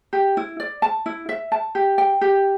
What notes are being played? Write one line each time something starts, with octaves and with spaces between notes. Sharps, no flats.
G4
E4
D5
A5
E4
E5
A5
G4
G5
G4